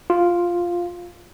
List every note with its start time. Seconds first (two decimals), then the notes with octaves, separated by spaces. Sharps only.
0.10 F4